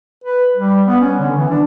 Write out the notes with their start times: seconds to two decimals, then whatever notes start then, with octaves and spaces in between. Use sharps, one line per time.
0.24 B4
0.57 G3
0.87 B3
1.01 C#4
1.19 D3
1.37 E3
1.50 D4